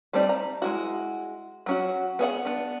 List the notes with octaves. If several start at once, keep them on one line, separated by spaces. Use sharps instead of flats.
G3 A3 C4 D#4 D5
A#5
G#3 E4 F#4
F#3 C#4 F#4
B3 G#4 C#5 F#5
B3 D4